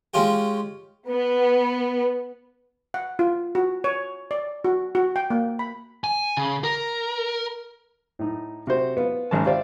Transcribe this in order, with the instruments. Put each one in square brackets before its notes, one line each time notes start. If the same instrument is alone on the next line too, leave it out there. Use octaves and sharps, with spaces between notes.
[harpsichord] G#3 C#4 F4 G4
[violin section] B3
[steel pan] F#5
F4
F#4
C#5
D5
F#4
F#4
G5
A#3
B5
[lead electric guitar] G#5
C#3
A#4
[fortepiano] A2 D#4
C3 F#4 C5
B3 F4
G#1 G#2 C#4 A#4 A5
F4 G4 C5 D5 E5 F5